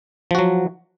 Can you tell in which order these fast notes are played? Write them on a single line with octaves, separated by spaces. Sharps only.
F3 F#4 F#3